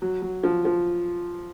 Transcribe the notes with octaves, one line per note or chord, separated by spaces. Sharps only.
F#3
F#3
F3
F3